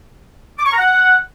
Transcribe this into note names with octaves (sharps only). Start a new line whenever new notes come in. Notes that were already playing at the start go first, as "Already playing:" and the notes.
D6
C#6
A#5
F#5